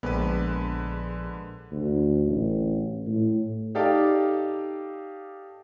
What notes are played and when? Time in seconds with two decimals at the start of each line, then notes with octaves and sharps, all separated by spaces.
0.03 A#1 D3 G#3 B3 B4
1.72 D2
2.27 A1
3.07 A2
3.75 D#4 G4 A4 D5 F5